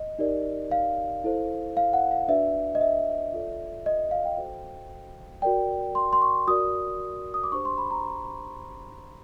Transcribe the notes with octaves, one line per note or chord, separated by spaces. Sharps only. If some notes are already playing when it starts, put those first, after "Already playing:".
Already playing: D#5
D#4 G4 A#4 D5
F5
E4 A4 C5
F5
F#5
F5
D4 F#4 B4 D5 E5
D#5
E5
F4 A4 D5
D#5
F5
G5
F#4 A4 C5
F#4 A#4 D5 G5
C6
C6
C#6
F#4 A#4 D5 D#6
D#6
D6
D4 G4 C5 C#6
C6
B5
A#5